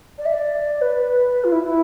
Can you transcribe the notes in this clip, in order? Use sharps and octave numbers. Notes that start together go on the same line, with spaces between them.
D5
E5
D5
B4
F4
E4
E4